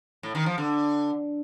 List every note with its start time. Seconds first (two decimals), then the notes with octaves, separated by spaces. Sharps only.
0.23 A2
0.35 D#3
0.46 F3
0.58 D3